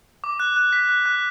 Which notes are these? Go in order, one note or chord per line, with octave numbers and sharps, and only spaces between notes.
D6
F#6
F#6
B6
F#6
F#6